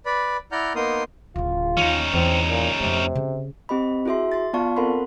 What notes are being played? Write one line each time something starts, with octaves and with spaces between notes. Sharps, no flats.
B4 D5 B5
E4 D5 F#5 A#5 F6 G6
A#3 B3 D#4 A#4 C6 D#6
D1 C#3 F4
D#2 C#4 D#4
E2 C4
A#2
F2 C3 A3
C#3
C4 G4 D#5 B5
E4 F#4 G#4 E5 C6
C6 A6
B3 F4 D5 F5 A5 C#6
C4 A4 A#4 F#5 B5 C6